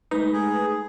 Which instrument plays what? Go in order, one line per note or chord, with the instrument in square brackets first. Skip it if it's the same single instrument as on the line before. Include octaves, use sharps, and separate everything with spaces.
[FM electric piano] G#3 A3 B4 [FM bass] D#4
[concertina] G#4